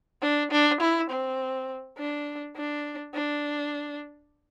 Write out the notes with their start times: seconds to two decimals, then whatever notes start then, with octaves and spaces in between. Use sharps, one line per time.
0.22 D4
0.51 D4
0.80 E4
1.10 C4
1.98 D4
2.56 D4
3.14 D4